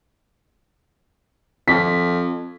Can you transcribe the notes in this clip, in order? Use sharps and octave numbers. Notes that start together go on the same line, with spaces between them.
F2 B6